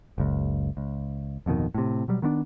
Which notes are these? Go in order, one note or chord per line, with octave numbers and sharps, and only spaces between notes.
F#1 C#2
C#2
D1 F2 B2 D#3
A2 C3
B2 F#3 G3
D#3 B3 C4 D4